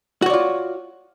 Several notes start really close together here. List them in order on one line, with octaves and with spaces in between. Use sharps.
F#4 C#5 D5 F4